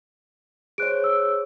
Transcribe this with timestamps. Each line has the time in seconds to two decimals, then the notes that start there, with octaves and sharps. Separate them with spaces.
0.78 G#4 C5 C#5 F#6 D7
1.04 E6